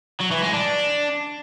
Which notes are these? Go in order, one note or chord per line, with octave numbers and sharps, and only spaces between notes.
F#3
E3
G#3
D4